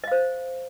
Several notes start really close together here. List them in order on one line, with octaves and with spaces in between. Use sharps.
D#5 F5 C5